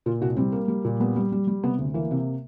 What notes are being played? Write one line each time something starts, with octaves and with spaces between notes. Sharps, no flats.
A#2 F4
C2 F#4
G3 C4
A#3
G3
A#2
G3 B3
G3
G3
G3
C3 B3
D2
E3 A#3
C3